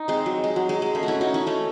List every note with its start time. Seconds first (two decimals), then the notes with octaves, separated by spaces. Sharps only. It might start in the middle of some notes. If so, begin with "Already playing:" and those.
Already playing: D#4
0.08 G#3 C4
0.26 F#3
0.44 G#3
0.56 F#3
0.69 G#3
0.82 G#3
0.95 A3 C#4
1.03 F#4
1.08 C#4 E4
1.21 D#4 F#4
1.34 C#4 E4
1.47 A3 C#4